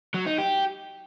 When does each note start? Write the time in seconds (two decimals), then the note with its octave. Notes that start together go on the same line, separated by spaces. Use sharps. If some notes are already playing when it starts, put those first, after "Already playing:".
0.14 F#3
0.26 D#4
0.38 G4